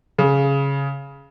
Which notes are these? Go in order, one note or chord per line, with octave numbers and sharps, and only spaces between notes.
C#3